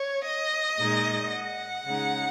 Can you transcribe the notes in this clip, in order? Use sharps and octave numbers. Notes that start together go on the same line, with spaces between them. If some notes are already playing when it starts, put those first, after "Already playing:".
Already playing: C#5
D#5
A#2 G#3 D#4
F#5
C#3 G#3 D#4